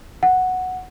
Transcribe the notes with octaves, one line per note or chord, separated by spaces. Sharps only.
F#5